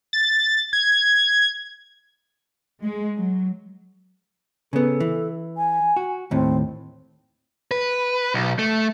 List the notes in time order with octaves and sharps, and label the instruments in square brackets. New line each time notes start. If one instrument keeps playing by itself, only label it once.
[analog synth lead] A6
G#6
[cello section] G#3
F#3
[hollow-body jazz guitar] C#3 B3 [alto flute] A4
[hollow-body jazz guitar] E3
[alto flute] G#5
[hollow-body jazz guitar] F#4
[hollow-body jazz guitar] D#2 A2 [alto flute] C4
[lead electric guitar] B4
B1
A3